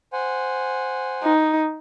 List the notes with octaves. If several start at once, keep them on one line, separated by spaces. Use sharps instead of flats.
C5 F#5 G#5
D#4